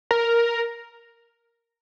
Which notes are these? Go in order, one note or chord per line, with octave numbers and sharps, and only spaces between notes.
A#4